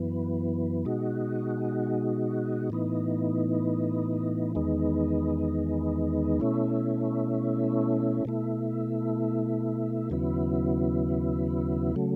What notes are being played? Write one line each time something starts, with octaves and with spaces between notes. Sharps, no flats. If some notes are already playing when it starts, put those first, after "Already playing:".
Already playing: F#2 E3 B3
B2 G#3 D#4 F#4
A2 E3 B3 D#4
E2 D#3 G#3 B3 D#4
B2 A3 C#4 E4
B2 A3 E4
D#2 C#3 F#3 B3 E4
C#3 F#3 A3